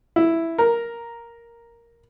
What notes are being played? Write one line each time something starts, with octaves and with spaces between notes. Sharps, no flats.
E4
A#4